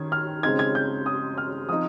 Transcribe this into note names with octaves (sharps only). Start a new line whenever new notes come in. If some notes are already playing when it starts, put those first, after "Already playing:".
Already playing: D#3 C#4 G#6
F6
C#3 G#3 C4 D#4 G#6
G#6
G6
D#6
F6
F3 C4 D#4 D#6